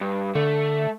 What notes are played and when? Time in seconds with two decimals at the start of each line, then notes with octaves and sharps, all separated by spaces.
0.01 G2
0.35 D3 A3